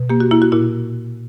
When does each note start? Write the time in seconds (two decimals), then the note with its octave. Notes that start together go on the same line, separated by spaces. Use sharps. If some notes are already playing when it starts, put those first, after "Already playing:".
Already playing: B2
0.10 A#3 G4
0.20 F#4
0.31 A#3 E4
0.42 F#4
0.52 A#2 E4